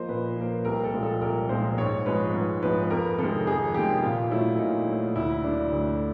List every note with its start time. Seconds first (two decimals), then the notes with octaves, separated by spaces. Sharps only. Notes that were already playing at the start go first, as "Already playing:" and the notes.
Already playing: F3 A#3 C5 D#5
0.09 A#2 B4
0.37 F3 A#3
0.65 C2 A#4
0.84 A4
0.94 A#2 F3 G#3
1.03 A4
1.21 C2 A#4
1.49 A#2 F3 G#3 C5
1.78 G#2 C#5
2.06 F3 G#3 B4
2.34 G#2
2.63 F3 G#3 B4
2.90 F2 A#4
3.18 C3 D#3 G#3 A4
3.47 F2 G#4
3.74 C3 D#3 G#3 G4
4.03 A#2 F4
4.31 F#3 A3 E4
4.59 A#2 D#4
4.88 F#3 A3
5.16 D2 E4
5.44 D3 F#3 D4
5.72 D2